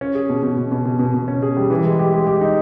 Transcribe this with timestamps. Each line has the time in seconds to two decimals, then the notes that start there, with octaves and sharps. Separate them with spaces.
0.01 C#4
0.15 G#4
0.29 B2
0.43 B2
0.58 B2
0.72 B2
0.85 B2
0.99 B2
1.14 B2
1.28 C#4
1.42 G#4
1.57 G3
1.70 E3
1.84 G#3
1.99 G4
2.13 G#3
2.27 G4
2.41 D#4